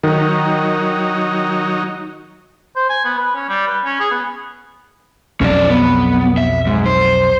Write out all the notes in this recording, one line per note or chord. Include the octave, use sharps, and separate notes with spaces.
D#3 F#3 D#4
C5
G#5
B3
B4
C#4
G3
B4
C#4
G#4
B3
B1 F2 F#3 C#4 D5
B3
E5
G#2
C5